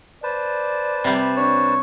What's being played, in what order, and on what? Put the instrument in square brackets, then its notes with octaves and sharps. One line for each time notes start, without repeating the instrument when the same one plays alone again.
[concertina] B4 C5 A5 [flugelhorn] D5
[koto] C3 G3
[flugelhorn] D4 [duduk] C#5